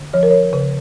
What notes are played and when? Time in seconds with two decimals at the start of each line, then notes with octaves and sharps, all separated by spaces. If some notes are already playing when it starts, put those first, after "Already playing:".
Already playing: D3
0.13 F3 C#5
0.23 A#4
0.30 C#5
0.53 C#3